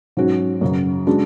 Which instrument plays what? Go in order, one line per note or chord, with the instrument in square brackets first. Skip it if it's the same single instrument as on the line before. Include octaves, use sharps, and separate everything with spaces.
[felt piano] G#2 F#3 C#4 F#4
F#2 C#3 F#3
C#3 G#3 D4 F#4